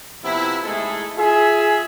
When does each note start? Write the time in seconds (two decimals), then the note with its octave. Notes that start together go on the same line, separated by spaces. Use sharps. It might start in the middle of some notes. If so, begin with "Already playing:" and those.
0.24 C3 F3 B3 E4
0.63 G#3 A3 D#4 E4 G#4 A4
1.18 F4 G#4 E5